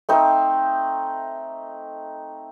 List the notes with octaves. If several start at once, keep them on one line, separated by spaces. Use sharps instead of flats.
A3 C4 D#4